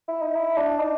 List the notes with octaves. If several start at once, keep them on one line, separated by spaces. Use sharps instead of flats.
E4
D#4
E4
D4
D#4